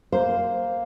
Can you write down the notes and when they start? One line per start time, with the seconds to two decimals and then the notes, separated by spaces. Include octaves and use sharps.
0.12 A#3 C5